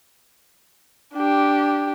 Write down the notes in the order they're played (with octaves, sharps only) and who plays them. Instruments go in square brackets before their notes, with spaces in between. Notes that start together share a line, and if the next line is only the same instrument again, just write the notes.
[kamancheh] D4 G4